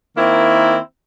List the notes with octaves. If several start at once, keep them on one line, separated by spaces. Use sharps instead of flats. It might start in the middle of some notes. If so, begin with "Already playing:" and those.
D#3 A#3 C4 E4